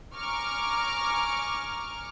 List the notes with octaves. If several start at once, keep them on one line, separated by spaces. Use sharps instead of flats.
G#5 A#5 C#6 D6 F6